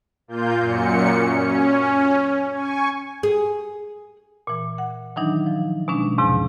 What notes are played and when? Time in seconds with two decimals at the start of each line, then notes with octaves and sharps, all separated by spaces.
0.28 A#2 A#3 F4 G6
0.60 F#2 A#2 C#7
1.18 C#4
2.51 G#5 C#6
3.23 G#4
4.47 A#2 E3
4.78 F#5
5.16 D#3 E3 F#3 D4 D#4
5.46 F3
5.88 B2 G#3 C#4 D4
6.18 E2 G#2 C3 F3